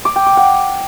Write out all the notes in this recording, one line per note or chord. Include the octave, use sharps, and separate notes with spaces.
D6
G5
D6
F#5